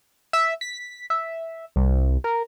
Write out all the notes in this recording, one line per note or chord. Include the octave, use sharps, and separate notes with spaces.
E5
B6
E5
C2
A#4